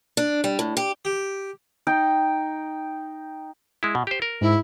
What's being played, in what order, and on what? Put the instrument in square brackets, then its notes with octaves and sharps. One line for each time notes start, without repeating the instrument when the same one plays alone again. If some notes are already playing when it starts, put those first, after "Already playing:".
[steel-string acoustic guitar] D4
G3
A2
G4
[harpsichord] G4
[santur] D#4 G5
[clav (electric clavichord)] G#3 E4
B2
G4 C5
A#4
[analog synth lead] G#2 [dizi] E4